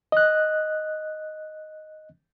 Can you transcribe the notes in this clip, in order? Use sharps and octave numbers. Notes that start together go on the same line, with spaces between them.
D#5 F#6